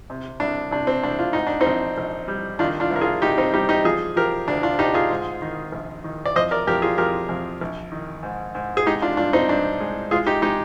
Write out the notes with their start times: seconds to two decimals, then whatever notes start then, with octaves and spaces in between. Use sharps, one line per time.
0.10 C3
0.40 C2 D4
0.71 C3 D4
0.87 C4
1.03 C2 D4
1.19 F4
1.33 G#2 D#4
1.47 D4
1.61 C4 D#4
1.66 A#1
1.98 A#1
2.28 G3
2.59 D#3 D4 F4
2.80 D4 F4
2.90 C2
2.96 A#4
3.01 F4 G#4
3.22 C2 D#4 G4
3.38 C4 D#4
3.54 G3 D#4 G4
3.69 D#4 G4
3.84 F3 F4 G#4
4.16 F3 G4 A#4
4.48 D2 D4
4.63 D4 F4
4.79 D2 D#4 G4
4.94 F4 G#4
5.10 G#2
5.42 D#3
5.72 A#1
6.04 D#3
6.26 D5
6.36 F2 C5 D#5
6.51 A#4 D5
6.67 F2 G4 A#4
6.82 F4 G#4
6.98 F2 G4 A#4
7.29 F2
7.61 A#1
7.92 D#3
8.23 G#2
8.55 G#2
8.77 G#4
8.86 G#3 D#4 G4
9.02 D4 F4
9.17 G2 D4 F4
9.33 C4 D#4
9.49 G2 D4
9.80 G#3
10.11 G#3 F4 G#4
10.26 D#4 G4
10.42 G#3 D#4 G4